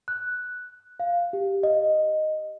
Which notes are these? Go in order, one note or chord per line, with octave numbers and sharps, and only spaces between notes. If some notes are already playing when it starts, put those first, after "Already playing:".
F#6
F5
G4
D#5